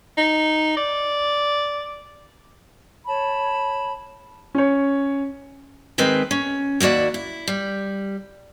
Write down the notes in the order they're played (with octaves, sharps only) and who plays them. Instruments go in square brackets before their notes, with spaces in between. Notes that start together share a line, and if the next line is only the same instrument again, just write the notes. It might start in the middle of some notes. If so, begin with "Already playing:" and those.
[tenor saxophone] D#4
D5
[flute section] C#5 A5 B5
[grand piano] C#4 C#5
[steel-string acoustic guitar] D#3 G#3 C4 A#4 B4
C#4
D#2 A#3 F#4 D5 E5
E4
G3